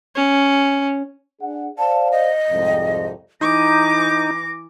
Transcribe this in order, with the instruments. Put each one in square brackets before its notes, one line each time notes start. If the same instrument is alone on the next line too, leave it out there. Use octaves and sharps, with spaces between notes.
[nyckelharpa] C#4
[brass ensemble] D4 G#4 F#5
[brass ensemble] C5 D5 F5 [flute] A5
[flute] D#5
[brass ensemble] C2 F2 G#2
[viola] E3 D6 [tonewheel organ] D#4 [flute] A#6